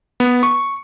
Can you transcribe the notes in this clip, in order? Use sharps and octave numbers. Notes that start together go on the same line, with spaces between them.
B3
C#6